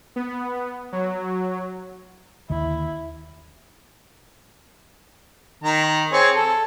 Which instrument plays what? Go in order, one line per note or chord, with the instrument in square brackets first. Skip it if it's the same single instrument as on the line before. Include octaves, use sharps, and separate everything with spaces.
[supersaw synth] B3
F#3
[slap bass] D#2 D3 [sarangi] E4
[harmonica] D#3 A#5
C4 G#4 C#5
A4